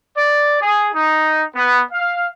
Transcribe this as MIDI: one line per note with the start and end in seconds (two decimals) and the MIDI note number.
0.17 0.57 74
0.61 0.88 68
0.94 1.43 63
1.55 1.80 59
1.93 2.28 77